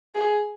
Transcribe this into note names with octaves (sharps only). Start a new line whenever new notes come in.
G#4